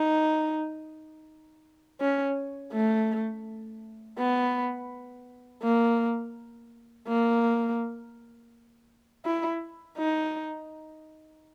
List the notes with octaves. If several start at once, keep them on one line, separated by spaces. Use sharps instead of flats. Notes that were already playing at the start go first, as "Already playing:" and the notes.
Already playing: D#4
C#4
A3
B3
A#3
A#3
E4
D#4